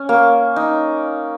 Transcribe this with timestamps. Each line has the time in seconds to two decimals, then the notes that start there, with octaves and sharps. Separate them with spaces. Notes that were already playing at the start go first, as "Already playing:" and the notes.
Already playing: C#4
0.09 A#3
0.56 D#4